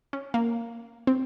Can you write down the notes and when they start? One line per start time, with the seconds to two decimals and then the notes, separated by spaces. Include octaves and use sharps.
0.13 C#4
0.34 A#3
1.07 C4